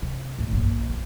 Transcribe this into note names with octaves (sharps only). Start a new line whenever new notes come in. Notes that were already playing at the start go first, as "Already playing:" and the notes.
C3
E2 A2
A#1 G2
E4